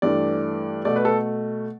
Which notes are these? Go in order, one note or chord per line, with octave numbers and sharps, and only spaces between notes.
G2 E3 A3 D5
B2 A3 D5
B4
A4